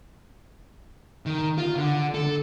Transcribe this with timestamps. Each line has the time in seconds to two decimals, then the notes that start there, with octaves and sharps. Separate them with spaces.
1.26 D#3
1.58 F4
1.76 D3
2.14 A4